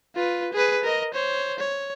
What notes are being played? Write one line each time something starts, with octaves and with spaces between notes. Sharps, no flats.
F4 B4
G#4 B4
A#4 D#5
C5 C#5
C#5